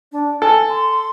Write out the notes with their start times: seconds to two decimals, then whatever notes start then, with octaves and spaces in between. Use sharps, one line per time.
0.12 D4
0.42 A4 G#5
0.69 C6